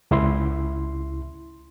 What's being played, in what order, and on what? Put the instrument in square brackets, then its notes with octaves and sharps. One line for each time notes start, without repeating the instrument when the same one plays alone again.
[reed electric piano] C#2 E4 C6